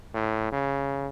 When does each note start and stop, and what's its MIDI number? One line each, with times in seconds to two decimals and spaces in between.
0.14 0.52 45
0.52 1.08 49